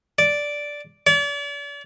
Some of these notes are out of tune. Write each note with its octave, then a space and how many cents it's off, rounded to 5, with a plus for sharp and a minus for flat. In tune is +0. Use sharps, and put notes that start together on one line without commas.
D5 -5
D5 -40